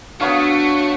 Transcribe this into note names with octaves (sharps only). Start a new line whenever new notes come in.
A3 B3 D4 F#4 C#5 F5